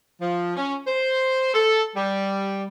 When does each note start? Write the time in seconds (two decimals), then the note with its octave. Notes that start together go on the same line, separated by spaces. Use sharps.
0.21 F3
0.57 C#4
0.87 C5
1.54 A4
1.95 G3